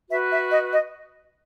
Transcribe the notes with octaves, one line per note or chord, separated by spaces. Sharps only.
F#4 B4 E5
E5
D#5
D#5